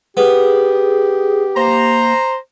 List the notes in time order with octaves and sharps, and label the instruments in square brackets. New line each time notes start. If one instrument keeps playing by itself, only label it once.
[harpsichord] B3 [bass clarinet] G4 [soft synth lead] G#4
[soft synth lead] A#3 [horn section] C5 A#5